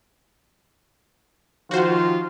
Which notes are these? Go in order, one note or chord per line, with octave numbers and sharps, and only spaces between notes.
D#3 F3 F4 F#4 C5